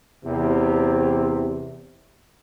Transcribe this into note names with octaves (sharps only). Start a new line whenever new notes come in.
E2 C3